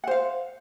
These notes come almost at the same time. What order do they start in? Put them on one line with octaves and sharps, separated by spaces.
F#5 C5 F5